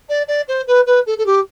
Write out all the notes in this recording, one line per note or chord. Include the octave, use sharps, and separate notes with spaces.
D5
D5
C5
B4
B4
A4
A4
G4